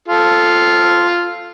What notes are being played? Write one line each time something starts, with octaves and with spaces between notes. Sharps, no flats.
F4 A4